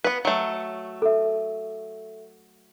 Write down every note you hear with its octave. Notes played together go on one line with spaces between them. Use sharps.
B3 B4
F#3 A3
A4 E5